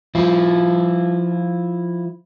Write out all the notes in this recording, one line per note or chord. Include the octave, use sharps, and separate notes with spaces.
F3 E4 F4